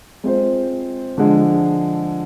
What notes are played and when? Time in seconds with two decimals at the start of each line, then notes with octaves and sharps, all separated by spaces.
0.24 G#3 C4 F4 C5
1.18 D3 F3 G#3